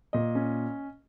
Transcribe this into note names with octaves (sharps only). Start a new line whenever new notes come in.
A#2 D#5
C#4